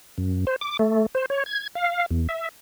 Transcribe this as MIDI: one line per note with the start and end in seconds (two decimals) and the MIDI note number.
0.18 0.45 42
0.47 0.56 72
0.61 0.77 86
0.79 1.06 57
1.15 1.26 72
1.30 1.44 73
1.46 1.68 92
1.75 2.06 77
2.11 2.27 40
2.29 2.49 76